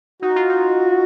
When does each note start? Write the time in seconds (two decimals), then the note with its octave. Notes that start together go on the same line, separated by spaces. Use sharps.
0.22 D#4 F#4
0.36 F4
0.49 D#4